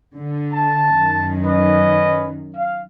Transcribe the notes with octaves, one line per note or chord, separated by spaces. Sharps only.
D3
A5
F#2 D#3
C#4 B4 D#5
F5